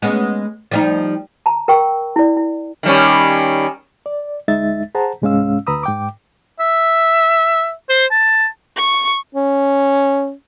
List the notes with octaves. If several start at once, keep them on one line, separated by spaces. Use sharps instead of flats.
G#3 B3 C#4
F3 G3 D#4
A5 A#5
A#4 G5 C#6 E6
E4 D5
E4
D#3 G3 C#4
D5
D2 G#3 D#4 E5 A6
G#4 C5 F#5 A5 A#5
C2 G#2 G#3 C#4 F5 E6
D2 B4 A#5 B5 D#6 E6
G#2 G5 D6
E5
C5
A5
C#6
C#4